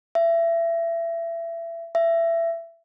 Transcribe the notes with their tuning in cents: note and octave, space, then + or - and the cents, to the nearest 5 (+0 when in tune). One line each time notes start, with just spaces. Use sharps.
E5 +25
E5 +20